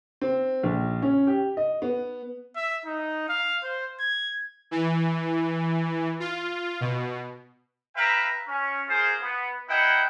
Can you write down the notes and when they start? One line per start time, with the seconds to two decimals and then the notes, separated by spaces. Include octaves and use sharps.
0.22 C4
0.63 A#1
1.02 C#4
1.27 G4
1.57 D#5
1.82 B3
2.56 E5
2.86 D#4
3.29 F5
3.64 C5
4.00 G#6
4.71 E3
6.20 F4
6.81 B2
7.96 B4 E5 F5 G5 A#5
8.47 C#4
8.88 A#3 F4 G#4 C5
9.21 B3
9.68 A#3 E4 D#5 F#5 G5